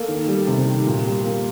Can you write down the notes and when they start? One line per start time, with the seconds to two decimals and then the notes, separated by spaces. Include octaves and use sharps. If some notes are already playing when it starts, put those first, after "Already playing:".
Already playing: A#3 A4
0.08 D#3
0.28 G3
0.47 C3
0.66 D#3
0.87 A#2
1.06 G3
1.24 A#3